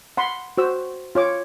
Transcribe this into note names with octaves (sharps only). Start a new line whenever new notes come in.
F#5 B5 C6
F#4 C5 E6
F4 C#5 D6